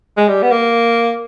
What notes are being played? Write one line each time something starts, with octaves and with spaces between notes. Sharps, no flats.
G#3
G3
B3
A#3